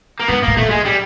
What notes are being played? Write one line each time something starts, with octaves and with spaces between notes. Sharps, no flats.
A#3
G#2 B3
A2 A#3
A#2 A3
G#3
G3